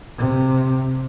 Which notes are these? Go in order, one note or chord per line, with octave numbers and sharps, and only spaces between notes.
C3